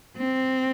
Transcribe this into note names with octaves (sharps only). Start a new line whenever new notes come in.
C4